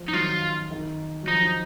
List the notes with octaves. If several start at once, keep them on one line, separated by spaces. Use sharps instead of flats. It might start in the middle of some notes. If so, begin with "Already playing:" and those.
Already playing: F3
D#4
D#3 F#3 F4
D#3
F#3
F3 D#4